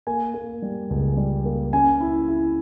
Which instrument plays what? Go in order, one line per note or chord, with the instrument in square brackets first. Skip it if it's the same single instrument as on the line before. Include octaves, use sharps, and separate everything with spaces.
[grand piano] A#3 G#5
A#3
G3
C#2
G3
A#3
C#4 G#5
E4
E4